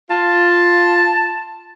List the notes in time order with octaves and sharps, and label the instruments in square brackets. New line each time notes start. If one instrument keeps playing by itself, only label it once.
[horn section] F4 [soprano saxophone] A5